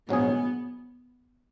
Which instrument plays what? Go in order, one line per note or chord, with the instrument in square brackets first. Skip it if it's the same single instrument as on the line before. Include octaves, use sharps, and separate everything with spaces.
[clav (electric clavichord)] A#1 G#2 F#3 C#4 G#4 [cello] B3